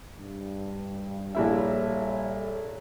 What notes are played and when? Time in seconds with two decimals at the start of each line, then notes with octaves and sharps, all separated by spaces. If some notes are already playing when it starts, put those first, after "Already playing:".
0.17 G2
1.35 A#1 G3 E4 A4 C#5 E5